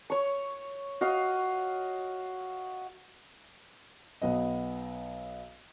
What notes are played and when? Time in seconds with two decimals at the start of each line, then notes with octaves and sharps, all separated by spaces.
0.10 C#5 C#6
1.01 F#4 D#5 F5
4.22 B1 B3 D#5